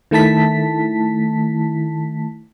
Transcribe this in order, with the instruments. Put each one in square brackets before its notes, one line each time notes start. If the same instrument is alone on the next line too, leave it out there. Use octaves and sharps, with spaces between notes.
[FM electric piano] D#3 A3 E4 A5 B6